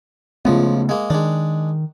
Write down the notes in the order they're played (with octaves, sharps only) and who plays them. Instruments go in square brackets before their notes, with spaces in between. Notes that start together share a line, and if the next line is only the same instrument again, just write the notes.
[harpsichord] C#2 F3 [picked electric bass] C#3 A3 B3
[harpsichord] G#3 A#3
[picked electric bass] D#3 [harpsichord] G#3 D4